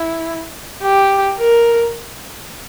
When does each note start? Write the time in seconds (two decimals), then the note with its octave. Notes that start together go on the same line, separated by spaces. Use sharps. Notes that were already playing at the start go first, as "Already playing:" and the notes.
Already playing: E4
0.83 G4
1.38 A#4